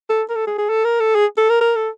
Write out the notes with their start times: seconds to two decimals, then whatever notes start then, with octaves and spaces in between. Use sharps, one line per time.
0.09 A4
0.29 A#4
0.35 A4
0.47 G#4
0.58 G#4
0.69 A4
0.84 A#4
1.00 A4
1.15 G#4
1.38 A4
1.49 A#4
1.61 A#4
1.76 A4